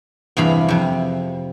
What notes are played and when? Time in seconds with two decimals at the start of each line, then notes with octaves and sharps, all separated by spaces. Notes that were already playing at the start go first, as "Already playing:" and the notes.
0.37 E2 G2 C3 G#4 F5 B5
0.68 F2 C3